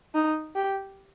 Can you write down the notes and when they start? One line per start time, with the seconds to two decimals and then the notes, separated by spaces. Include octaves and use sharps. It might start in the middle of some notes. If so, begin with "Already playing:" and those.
0.15 D#4
0.55 G4